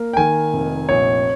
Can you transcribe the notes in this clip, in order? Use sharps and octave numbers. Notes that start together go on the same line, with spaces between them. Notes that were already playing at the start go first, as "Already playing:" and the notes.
Already playing: A#3
G5
D#3 G#5
F1
A#1 C#5